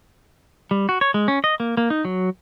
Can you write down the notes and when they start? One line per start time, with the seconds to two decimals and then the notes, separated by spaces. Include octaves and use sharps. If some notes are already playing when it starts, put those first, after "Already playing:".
0.71 G3
0.89 F#4
1.01 C#5
1.14 G#3
1.28 C#4
1.44 D#5
1.60 A#3
1.77 A#3
1.90 D#4
2.05 F#3